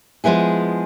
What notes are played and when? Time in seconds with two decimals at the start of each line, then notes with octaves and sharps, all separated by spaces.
0.24 F3 G#3 B3 E4 G#4